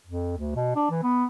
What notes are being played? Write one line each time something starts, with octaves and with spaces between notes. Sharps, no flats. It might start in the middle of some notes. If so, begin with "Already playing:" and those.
F2
D2
B2
D4
E3
B3